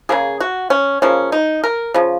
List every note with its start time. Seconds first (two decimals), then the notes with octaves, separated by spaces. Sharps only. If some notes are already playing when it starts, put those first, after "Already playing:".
0.09 C#3 F3 A#3 G#4
0.40 F#4
0.70 C#4
1.02 C#3 F3 A#3 C#4
1.32 D#4
1.64 A#4
1.94 C#3 F3